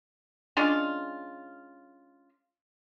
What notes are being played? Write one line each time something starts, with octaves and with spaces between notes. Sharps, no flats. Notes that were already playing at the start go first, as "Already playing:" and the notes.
G#3 C#4 D4 F4